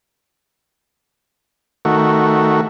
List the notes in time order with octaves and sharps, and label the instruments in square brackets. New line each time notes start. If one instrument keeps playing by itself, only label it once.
[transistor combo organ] D#3 A3 F#4